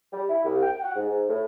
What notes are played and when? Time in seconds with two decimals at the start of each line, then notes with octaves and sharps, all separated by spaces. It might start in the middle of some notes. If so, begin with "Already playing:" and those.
0.12 G3
0.28 E4
0.43 C2
0.61 G5
0.82 F#5
0.95 G#2
1.29 A2